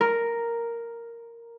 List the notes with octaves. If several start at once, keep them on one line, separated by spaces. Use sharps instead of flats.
A#4